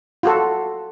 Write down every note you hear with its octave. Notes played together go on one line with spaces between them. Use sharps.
F4 F#4 A4